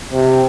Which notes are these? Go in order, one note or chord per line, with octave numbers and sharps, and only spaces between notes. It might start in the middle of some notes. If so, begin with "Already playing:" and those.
C3